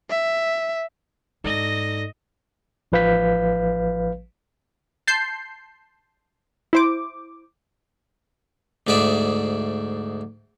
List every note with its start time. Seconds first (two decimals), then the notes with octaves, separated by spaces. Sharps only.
0.10 E5
1.44 G#2 D#4 A4 D5 D#5 A#6
2.92 A1 F3 B4 F5 G6 B6
5.07 A5 C6 G6 C7
6.73 E4 C5 D6
8.87 D2 G#2 G#4 D5 E5